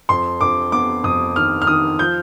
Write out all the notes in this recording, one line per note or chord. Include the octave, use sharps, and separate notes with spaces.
F2 C6
F2 D6
B3 D6
F2 D#6
D#3 F6
F6
D#3 D#6
F3 G6